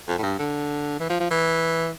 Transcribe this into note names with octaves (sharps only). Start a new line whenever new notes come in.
F2
A2
G2
D3
E3
F3
F3
E3